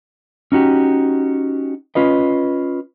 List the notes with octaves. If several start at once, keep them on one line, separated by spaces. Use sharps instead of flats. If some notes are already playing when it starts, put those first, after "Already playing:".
C#4 D#4 F#4 G4
C#4 F4 B4 D#5